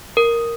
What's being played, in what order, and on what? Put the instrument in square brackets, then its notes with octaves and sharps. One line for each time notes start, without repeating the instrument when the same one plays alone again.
[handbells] A#4